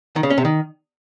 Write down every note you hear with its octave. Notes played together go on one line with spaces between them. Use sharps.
D#3
C#3
C#4
C3
D#3